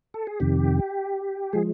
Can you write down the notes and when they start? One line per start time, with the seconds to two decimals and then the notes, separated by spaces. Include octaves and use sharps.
0.14 A4
0.27 G#4
0.40 F2 C3 D#3 G4
1.53 F3 G#3 G#4